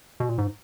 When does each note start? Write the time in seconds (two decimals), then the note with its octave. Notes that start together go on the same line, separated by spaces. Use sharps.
0.20 B2
0.29 A#2
0.38 G#2